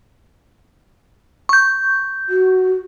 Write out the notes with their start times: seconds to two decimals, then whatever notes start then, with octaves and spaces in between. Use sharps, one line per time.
1.49 C#6 G6
2.29 F#4